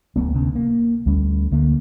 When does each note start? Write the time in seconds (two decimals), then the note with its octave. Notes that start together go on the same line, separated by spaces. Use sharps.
0.16 D1 F#3 A3 B3
0.34 D2 C3 B3 C#4
0.55 A#3
1.06 D2 G3 A3 C#4
1.51 D2 D3 A3 A#3